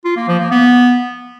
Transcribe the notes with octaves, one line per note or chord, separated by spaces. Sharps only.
F4
A#3
F3
A#3
B3